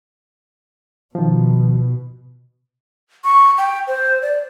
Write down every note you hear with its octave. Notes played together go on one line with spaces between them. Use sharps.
B2 D#3 F3
C#6
G5
C5
D5